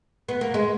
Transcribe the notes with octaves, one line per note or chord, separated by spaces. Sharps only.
B3
A#3
G#3